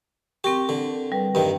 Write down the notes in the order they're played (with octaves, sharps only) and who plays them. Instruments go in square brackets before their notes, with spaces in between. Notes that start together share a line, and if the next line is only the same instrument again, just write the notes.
[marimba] C4 A#4 C#6 [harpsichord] G4
[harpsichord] D3
[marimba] G3 B4
[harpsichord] G2 D#3